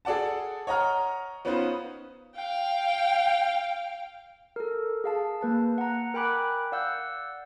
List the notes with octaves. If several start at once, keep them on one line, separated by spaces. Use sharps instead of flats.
G#4 A4 D5 F#5 A5
C#5 D#5 F#5 A#5 F6
B3 C#4 D#4 F4 B4 C5
F5 G5
A4 A#4
G#4 F5 A5
A#3 B4 A5
F#5 A#5
A#4 G5 G#5 B5 D6 F#6
D5 F5 F#5 E6 F#6 G6